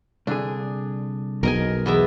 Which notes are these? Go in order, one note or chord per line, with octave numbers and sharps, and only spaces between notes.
C2 D3 D4 G#4
B1 B2 A#4 D#5 G#5
E2 B3 E5